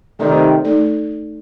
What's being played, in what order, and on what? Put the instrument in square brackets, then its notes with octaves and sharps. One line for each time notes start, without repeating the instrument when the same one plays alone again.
[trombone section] C3 D#3 [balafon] A3 D#4 A4 D5
[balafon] A3 D#4 A4 D5